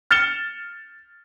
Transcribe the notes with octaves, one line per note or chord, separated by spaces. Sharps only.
F6 A6 C#7 E7 G7